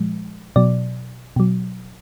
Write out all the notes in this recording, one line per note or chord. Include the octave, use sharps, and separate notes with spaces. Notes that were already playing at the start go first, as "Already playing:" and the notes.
Already playing: A#2 F3 G#3
B2 F#3 D5
B2 F#3